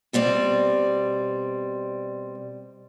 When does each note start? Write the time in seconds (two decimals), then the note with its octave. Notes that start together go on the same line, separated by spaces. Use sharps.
0.13 B2 G3 C4 D5